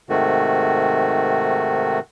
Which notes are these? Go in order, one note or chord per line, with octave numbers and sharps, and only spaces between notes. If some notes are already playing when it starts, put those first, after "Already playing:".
G#2 C3 D#3 A3 F#4